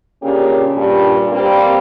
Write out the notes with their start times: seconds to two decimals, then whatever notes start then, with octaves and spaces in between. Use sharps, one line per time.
0.23 A#2 C#3 A#3 C#4 D4 G4
0.76 G2 A#2
1.31 G3 A#3 C4